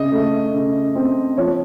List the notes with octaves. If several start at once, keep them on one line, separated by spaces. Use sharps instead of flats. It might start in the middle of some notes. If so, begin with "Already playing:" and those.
Already playing: C#3 D#5
A3
C#3
C4
F3 C#5